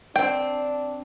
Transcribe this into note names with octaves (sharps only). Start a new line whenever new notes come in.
C4 D4 C5 G5